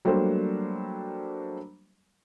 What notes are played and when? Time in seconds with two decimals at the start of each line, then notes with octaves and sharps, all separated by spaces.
0.05 F#3 G3 A3 A#3 D4 C5